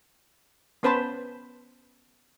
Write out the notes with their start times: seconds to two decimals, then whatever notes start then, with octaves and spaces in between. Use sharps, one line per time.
0.83 B3 C#4 B4 C5 A5 B5